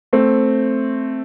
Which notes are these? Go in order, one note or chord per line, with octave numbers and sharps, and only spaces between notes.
A3 C4